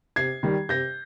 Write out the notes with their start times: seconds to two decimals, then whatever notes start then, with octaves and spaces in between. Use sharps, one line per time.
0.16 C3 G#6 C7
0.43 D#3 G3
0.69 C3 G6 A#6